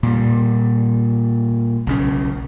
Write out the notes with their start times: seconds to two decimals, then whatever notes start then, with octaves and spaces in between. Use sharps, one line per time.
0.03 A#2 G3
1.87 B1 C#3 C#4